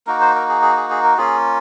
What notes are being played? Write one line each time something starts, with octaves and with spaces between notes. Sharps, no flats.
A#3 D#4 F#4 A#4
C5
A#4
G#4
G#4
G#4
G#4
A#4
A#3 C#4 F4 G#4